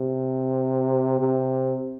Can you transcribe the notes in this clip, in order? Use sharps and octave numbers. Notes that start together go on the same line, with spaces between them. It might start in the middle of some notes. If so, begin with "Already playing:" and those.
Already playing: C3
C3